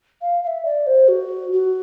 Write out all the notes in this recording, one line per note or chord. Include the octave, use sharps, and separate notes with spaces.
F5
F5
E5
D5
C5
F#4
F#4